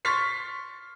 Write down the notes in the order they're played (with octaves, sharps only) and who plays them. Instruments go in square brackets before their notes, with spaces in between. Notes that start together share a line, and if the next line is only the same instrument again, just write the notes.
[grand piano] C6 C#6 F6 A6 B6 C7